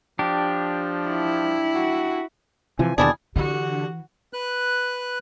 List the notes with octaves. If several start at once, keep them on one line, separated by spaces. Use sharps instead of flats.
F3 D4 G4
E4
F#4
C3 E3 F3 G#5
D#2 B2 D3 G3 E4 G#4 D5 A5
D3 E3 F#4 G4
B4 F#6